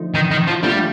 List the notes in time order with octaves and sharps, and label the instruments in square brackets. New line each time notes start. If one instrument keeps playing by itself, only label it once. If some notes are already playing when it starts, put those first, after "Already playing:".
Already playing: [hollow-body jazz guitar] D3 F3 A3 D#4
[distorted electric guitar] D#3
D#3
F3
[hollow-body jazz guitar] D3 A3 D4 F4 [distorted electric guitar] G3